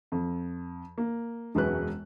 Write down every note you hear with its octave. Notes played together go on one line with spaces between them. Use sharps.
F2
A#3
E1 F#2 G#3 F#4 B4 F#6